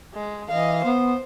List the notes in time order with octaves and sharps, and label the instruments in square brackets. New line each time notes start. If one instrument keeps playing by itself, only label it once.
[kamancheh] G#3
[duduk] E3 [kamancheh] D#5 F5
[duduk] B3 [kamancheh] C5